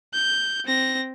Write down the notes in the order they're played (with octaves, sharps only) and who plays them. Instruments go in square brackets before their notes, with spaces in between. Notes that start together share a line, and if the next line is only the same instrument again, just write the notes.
[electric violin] G6
C4 A#6